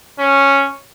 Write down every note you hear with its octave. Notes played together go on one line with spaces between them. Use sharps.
C#4